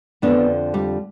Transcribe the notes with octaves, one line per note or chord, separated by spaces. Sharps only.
F2 D3 F3 B3 D4
G3